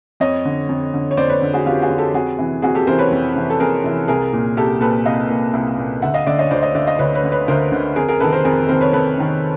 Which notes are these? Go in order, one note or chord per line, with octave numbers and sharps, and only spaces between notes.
F2 C#5 D#5
D3
F2
D3
C#5
F2 C5 D5
B4 C#5
D3
F#4 G#4
F2 F4 G4
F#4 G#4
D3
G4 A4
F2 F#4 G#4
C3 E3
F2 F#4 G#4
G4 A4
C3 E3 A#4 C5
B4 C#5
F2
C3 E3
A4
F2 G#4 A#4
C3 E3
C2 G#4 A#4
A#2
C2 G4 A4
A#2 A4 B4
C2 D#5 F5
A#2
C2
A#2
D2 E5 F#5
D#5 F5
D3 D5 E5
C#5 D#5
D2 C5 D5
C#5 D#5
D3 D5 E5
D#5 F5
D2 B4 C#5
B4 C#5
D3
B4 C#5
D2 A#4 C5
D3
F2 G#4 A#4
G#4 A#4
C3 D#3 A4 B4
A#4 C5
F2 G#4 A#4
C3 D#3 A#4 C5
B4 C#5
F2 A4 B4
C3 D#3